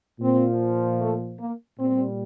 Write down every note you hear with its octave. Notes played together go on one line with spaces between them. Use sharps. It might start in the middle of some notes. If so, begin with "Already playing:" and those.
A#2 F3 C4
A3
A#3
A#2 G3 C4